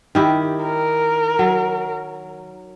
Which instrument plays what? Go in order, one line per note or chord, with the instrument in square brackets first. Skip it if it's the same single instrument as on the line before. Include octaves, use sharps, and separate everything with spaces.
[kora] D#3 E4 G4
[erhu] A#4
[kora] F#3